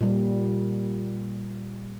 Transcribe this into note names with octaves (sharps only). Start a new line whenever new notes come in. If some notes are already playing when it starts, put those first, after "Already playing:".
A#2 G3